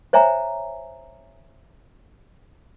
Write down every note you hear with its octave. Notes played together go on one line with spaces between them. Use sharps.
C5 C#5 E5 G#5 A#5